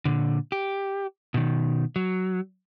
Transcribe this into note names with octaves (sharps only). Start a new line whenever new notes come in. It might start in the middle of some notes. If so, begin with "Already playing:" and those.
A#2 D3
G4
B2 D#3
F#3